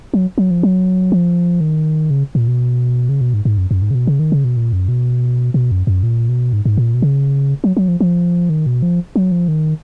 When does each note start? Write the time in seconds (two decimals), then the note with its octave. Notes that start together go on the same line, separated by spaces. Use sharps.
0.14 F#3
0.38 F#3
0.51 F3
0.63 F#3
1.12 F3
1.61 D#3
2.10 C#3
2.35 A#2
2.48 B2
3.09 C#3
3.21 B2
3.34 G#2
3.45 G#2
3.58 F#2
3.71 F#2
3.82 G#2
3.91 C#3
3.95 B2
4.07 C#3
4.19 D#3
4.32 C#3
4.44 B2
4.57 A#2
4.73 F#2
4.88 B2
5.54 B2
5.71 F#2
5.87 F#2
6.03 A#2
6.29 B2
6.53 G#2
6.65 G#2
6.77 A#2
6.94 B2
7.02 C#3
7.64 F#3
7.77 F#3
7.88 F3
8.01 F3
8.50 D#3
8.66 B2
8.82 F3
9.16 F#3
9.32 F3
9.48 D#3